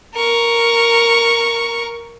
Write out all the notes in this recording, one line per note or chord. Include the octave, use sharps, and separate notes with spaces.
A#4 C#6